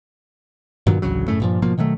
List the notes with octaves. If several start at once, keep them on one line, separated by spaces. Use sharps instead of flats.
G2 A#2 D#3 F#3
A1 D2 C#3 F#3
F#2 A2 C#3 A3
G2 A#2 F3
G#2 B2 F3 A#3
B2 D#3 F#3 A3